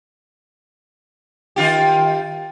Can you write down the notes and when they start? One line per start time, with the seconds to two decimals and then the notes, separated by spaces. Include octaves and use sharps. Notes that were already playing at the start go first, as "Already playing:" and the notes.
1.56 D#3 F4 G4